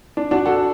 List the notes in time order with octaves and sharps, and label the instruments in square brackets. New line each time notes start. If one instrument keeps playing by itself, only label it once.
[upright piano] D4
D4 F#4
F#4 A4